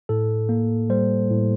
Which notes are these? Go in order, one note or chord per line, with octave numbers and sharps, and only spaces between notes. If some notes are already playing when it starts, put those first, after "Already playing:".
A2 A4
A#3
G3 C5
A2